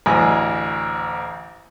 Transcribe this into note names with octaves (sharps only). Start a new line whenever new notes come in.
A1 D2 D#5 G#5